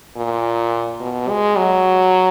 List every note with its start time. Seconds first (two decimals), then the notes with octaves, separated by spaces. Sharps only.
0.17 A#2
1.00 B2
1.29 G#3
1.57 F#3